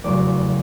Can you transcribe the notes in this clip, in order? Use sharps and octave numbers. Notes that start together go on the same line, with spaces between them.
F1 E2 C#3 F#3 D5